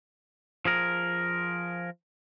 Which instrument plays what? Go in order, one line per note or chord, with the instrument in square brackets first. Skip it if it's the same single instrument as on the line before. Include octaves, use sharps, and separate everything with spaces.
[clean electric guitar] F3 G#4 A#4